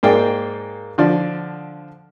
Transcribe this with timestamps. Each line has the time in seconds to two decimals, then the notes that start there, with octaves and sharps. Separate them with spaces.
0.03 G#2 A#3 G#4 D5 G5
0.98 D3 F3 D5